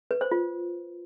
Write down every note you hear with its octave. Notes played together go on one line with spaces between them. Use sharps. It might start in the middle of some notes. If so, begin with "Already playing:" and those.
B4
C5
F4